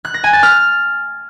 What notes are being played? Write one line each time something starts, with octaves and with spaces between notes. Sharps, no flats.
F#6
A#6
G#5
A6
F6